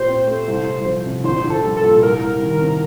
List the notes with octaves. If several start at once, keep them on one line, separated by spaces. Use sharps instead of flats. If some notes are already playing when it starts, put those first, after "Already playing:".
Already playing: A#2 G4 C5
C4
A3
C2
C2
F3
C3
A#1 C5
A#1
A4
G3
A4
A#2
C2 A#4
C2
D#3
C3